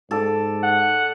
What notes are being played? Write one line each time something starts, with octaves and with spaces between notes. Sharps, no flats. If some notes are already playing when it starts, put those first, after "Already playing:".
G#2 A4 D5
F#5